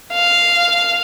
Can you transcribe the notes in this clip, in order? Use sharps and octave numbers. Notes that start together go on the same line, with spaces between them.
F5